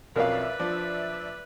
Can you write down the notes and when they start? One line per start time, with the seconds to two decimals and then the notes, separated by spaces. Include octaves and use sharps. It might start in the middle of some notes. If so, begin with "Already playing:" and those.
0.16 B1 F2 C#4 A#4 B4 D5 E5 F5
0.59 F3 D4